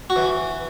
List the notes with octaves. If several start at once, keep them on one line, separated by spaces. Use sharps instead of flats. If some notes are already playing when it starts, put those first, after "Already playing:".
F#4
E3